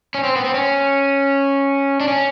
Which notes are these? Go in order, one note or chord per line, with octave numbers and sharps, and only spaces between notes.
C#4
C4
B3
C4
C#4
D4
C#4